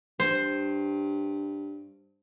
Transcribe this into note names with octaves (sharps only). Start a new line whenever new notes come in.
G2 C5